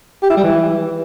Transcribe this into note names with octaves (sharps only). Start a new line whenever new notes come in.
G4
E4
G3
E3